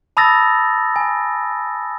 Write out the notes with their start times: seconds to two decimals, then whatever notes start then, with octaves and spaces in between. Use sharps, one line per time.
0.17 A5 B5 D#6 E6 A6 A#6
0.96 G#5